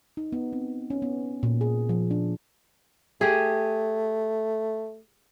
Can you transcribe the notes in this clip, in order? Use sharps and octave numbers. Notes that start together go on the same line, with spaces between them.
D#4
B3
C4
C#4
B3
A#2
G#4
F3
D4
A3 G4 G#4